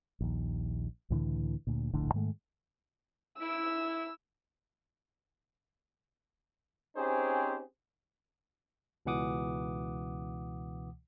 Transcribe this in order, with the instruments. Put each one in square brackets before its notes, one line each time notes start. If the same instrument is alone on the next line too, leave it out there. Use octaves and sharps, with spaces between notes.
[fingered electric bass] A#1 D#2
C#2 A2 D3 E3
D2 A#2
D1 A#1 A2 D3
G#2 D#3 G#3 A3
[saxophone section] E4 [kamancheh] E6
[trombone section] C4 C#4 D#4 G4 G#4 C5
[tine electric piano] C#2 B2 E3 F#5 D6 D#6